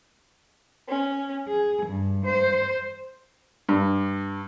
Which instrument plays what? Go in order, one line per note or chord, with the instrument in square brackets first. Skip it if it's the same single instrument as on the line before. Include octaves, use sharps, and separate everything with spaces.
[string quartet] C#4
G#4
G2
C5
[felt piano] G2